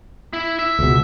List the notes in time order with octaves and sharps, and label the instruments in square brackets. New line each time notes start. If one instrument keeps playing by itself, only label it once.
[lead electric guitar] E4
E5
[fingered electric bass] C#2 B2